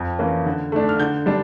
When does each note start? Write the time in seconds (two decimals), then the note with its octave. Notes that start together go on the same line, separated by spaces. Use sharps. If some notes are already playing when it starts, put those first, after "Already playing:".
Already playing: F2
0.19 E3 A#3 C#4
0.46 D3
0.72 A3 D4
0.89 F6
0.99 D3 G6
1.26 G3 D4